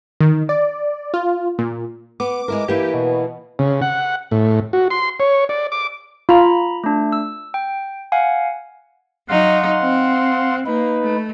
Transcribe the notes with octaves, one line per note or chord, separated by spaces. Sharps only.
D#3
D5
F4
A#2
B3 D6
G#3 E4 A#4
E3 A#3 E4 G4
B2
C#3
F#5
A2
F#4
C6
C#5
D5
D6
F4 A#5 B5
A3 D4
E6
G5
F5 F#5 G#5
F#3 D#4 F5 F#5 C6
C4
A#3 D#4 B4
A3